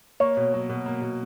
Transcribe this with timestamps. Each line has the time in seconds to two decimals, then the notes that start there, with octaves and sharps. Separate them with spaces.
0.20 A#3 C#5
0.37 B2
0.54 F#3
0.69 B2
0.86 A#3
1.01 B2